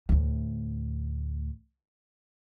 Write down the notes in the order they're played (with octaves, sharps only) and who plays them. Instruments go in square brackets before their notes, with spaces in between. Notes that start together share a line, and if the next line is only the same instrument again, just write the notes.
[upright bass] D2 A2